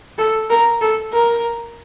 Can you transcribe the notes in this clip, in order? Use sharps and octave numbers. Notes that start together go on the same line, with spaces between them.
A4
A#4
A4
A#4